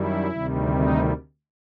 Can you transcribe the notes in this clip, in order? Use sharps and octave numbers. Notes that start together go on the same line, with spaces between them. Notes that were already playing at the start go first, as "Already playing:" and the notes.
Already playing: F#2 D#3 G3 E4
D2 C3 D#3 G3
D#4